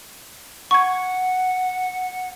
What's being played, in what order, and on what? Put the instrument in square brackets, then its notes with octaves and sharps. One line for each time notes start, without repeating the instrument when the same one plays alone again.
[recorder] F#5 [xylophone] C#6 G#6